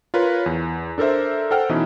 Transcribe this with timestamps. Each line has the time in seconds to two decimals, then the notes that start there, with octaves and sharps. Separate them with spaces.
0.14 F4 A#4 B4 C#5
0.46 E2
0.98 D4 A4 A#4 C5 E5
1.51 A4 C5 F#5 G5 F6
1.69 B2 E3 C#4 D#4 E4